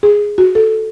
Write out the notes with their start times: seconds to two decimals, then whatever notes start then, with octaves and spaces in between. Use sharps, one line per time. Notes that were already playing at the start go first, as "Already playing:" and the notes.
0.03 G#4
0.38 F#4
0.55 A4